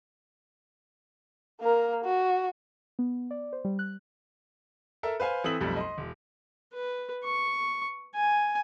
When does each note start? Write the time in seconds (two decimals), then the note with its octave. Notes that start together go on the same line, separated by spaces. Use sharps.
1.61 A#3 A#4
2.05 F#4
2.99 B3
3.31 D5
3.53 C5
3.65 G3
3.79 F#6
5.03 A4 A#4 E5
5.20 B4 C5 F5 G#5
5.44 E3 C4 A4 D#6 B6 F#7
5.61 B1 F2 G3 A3
5.76 D#5 C6
5.98 E1
6.74 B4
7.24 C#6
8.15 G#5